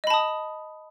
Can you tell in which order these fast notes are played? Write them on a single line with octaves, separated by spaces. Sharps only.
D#5 B5 A5 D#6